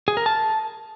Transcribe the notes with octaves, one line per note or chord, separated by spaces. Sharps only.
G#4
A#4
A5